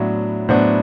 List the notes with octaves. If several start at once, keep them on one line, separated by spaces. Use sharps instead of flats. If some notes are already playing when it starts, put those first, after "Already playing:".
Already playing: A2 F#3 B3 D4 E5
A2 F#3 B3 D4 C5